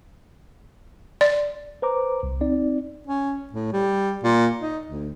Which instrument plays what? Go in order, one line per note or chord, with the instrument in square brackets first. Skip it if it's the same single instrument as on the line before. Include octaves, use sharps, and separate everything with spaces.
[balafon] D5
[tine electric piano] B4 C5 A#5 D6
C2
C4 D#4 D5
[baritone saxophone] C#4
A2
G3
A#2
D#4
D2